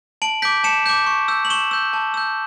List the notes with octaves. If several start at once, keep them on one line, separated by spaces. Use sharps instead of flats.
A5 D7 F#7
D6 G6 B6 D7
A5 C#7 E7
D6 G6
C#6
E6 G6
F#7
C#6 E7 G7
E6 G6
A5
E6 G6